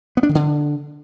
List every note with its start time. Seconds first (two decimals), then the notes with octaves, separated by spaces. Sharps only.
0.17 B3
0.23 D4
0.29 D#3
0.35 D3